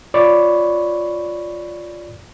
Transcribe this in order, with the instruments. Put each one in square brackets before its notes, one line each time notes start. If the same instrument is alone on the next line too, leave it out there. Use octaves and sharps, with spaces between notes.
[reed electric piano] F4 C#5 D5 B5 C#6